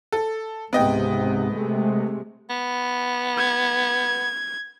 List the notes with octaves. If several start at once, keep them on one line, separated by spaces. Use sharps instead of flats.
A4
C#2 G#2 C3 B3 D#5 G5
C3 G#3 A3
B3
G#6